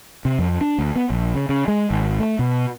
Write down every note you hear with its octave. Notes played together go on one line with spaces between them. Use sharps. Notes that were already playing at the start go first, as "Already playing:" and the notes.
C3
F2
D4
D2
B3
A#1
C#3
C#3
G#3
G#1
A3
B2